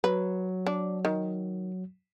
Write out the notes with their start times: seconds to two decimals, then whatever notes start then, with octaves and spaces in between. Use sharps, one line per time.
0.04 F#3 B4
0.66 D4
1.05 D#3